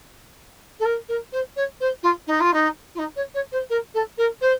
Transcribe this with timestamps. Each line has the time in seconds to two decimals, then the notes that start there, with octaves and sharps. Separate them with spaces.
0.80 A4
0.85 A#4
1.09 A#4
1.32 C5
1.56 C#5
1.80 C5
2.03 F4
2.27 D#4
2.40 F4
2.54 D#4
2.95 F4
2.99 D#4
3.16 C#5
3.34 C#5
3.52 C5
3.70 A#4
3.94 A4
4.18 A#4
4.41 C5